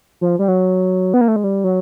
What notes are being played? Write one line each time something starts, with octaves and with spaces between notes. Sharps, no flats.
F3
G3
F#3
B3
A#3
A3
G#3
G3
F#3